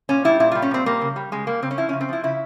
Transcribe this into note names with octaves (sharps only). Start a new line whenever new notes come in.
A#2 C#4
G3 E4
A#2 E4
G3 F4
C#4
A#2 C4
G3 A#3
C#3
G3
C#3 G#3
G3 A#3
C#3 C4
C#4
F3 E4
C#3 C#4
C4
F3 E4
C#3 E4